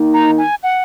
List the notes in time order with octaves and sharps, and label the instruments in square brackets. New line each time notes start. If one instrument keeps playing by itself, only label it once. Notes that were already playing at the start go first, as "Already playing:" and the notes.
Already playing: [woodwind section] D#3 A#3 D#4
[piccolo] A#5
G#5
F#5